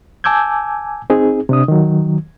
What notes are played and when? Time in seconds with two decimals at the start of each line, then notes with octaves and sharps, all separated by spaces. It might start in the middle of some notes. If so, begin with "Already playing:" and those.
0.24 G#5 A5 D6 E6 G6 G#6
1.10 C4 D#4 G#4
1.49 C3 D4 D#6
1.68 D#3 F#3